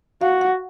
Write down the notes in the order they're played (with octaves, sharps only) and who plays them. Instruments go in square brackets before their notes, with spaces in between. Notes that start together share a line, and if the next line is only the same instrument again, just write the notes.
[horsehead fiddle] F#4 [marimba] F5
[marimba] F#5